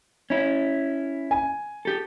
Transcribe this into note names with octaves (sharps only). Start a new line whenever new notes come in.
C#4 E4
G#5
G4 A4